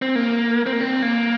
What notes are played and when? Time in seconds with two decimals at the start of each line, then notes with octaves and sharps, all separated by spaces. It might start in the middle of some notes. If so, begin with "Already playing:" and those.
0.02 C4
0.16 A#3
0.66 C4
0.73 A#3
0.80 C4
1.02 A#3